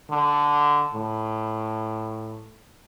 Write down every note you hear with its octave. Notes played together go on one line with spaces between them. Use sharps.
D3
A2